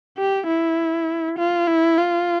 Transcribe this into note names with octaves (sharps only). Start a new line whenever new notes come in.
G4
E4
F4
E4
F4